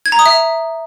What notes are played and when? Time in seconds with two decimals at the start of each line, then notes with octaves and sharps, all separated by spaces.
0.06 G#6
0.12 A#5
0.19 D#6
0.26 E5